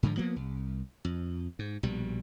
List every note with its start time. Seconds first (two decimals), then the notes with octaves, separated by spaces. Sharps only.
0.03 G#2 D3 F3
0.17 F3 A#3 B3
0.36 C2
1.05 F2
1.59 G#2
1.83 A#1 B2 G3